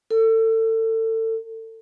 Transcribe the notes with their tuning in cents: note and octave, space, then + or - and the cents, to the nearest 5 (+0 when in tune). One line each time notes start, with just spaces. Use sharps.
A4 +30